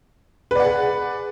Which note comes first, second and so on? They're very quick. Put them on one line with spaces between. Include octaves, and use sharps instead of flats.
B4 D5 F#5 G#4